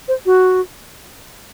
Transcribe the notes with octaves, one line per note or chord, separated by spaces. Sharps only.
C5
F#4